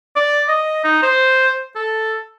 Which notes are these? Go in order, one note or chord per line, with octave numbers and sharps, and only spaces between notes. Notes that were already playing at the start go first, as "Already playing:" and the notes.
D5
D#5
D#4
C5
A4